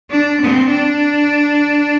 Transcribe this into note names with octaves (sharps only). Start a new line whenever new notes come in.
D4
C4
D4